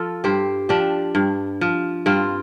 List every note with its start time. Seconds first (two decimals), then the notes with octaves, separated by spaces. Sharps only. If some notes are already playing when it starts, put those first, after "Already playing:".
Already playing: F3 F4 A4
0.24 G2 G4 C5
0.69 F3 D4 G4
1.15 G2
1.61 F3
2.06 G2 C4 F4